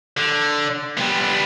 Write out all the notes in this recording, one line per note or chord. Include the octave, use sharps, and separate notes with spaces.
D3
G3 B3